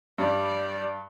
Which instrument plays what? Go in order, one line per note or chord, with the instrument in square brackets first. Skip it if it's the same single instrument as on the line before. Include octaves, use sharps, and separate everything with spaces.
[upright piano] G2 [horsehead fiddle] G3 D5